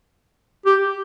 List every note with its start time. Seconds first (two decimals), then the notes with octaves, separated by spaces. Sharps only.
0.66 G4